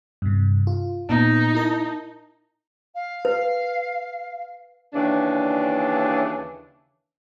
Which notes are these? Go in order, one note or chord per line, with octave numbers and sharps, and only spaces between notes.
G2 C3
F4
A#2 B3 D#4
E4 A#4 A5
F5
B4
D#2 C#3 E3 D4